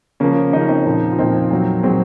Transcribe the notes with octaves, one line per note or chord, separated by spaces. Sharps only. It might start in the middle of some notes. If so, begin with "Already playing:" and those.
C#3 F3 A#3 C#4
C#3 F3 D#4
C#4
C4 D#4
A#2 F3
F4
A#2 F3 C4 D#4
A#2 F#3
A#2 F#3 G#3 C4